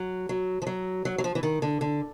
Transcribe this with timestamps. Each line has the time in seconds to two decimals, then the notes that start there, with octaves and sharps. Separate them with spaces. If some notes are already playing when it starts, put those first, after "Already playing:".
Already playing: F#3
0.29 F#3
0.62 F3
0.67 F#3
1.05 F#3
1.18 F#3
1.24 F3
1.35 E3
1.43 D#3
1.62 D3
1.81 D3